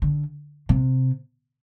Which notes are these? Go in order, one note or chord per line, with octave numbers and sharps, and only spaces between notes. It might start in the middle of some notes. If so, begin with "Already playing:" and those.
D3
C3